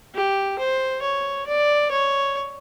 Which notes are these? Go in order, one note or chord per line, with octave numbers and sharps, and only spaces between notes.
G4
C5
C#5
D5
C#5